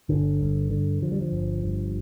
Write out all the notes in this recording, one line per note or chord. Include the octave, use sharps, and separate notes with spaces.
G1 D3
G2
D3
D3 F3
G3
F3
G1
G2